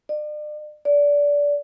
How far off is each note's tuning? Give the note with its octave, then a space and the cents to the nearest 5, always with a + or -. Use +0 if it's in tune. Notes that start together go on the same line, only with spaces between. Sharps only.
D5 +40
D5 -20